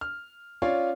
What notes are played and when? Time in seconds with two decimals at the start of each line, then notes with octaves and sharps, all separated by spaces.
0.01 F6
0.62 C#4 F4 C#5 D5 F5